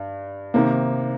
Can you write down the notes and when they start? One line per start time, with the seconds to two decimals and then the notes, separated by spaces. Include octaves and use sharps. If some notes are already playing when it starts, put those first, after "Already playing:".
Already playing: G2
0.54 C3 D#3 A#3